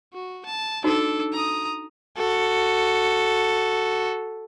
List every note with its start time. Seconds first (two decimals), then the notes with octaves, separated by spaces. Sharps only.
0.14 F#4
0.46 A5
0.84 D4 D#4 F#4 A4
1.33 A#5 D#6
2.17 F#4 A4